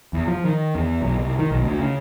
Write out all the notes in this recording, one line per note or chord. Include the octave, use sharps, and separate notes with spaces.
E2
F3
D#3
E2
B1
C2
D#3
B1
D2
C#3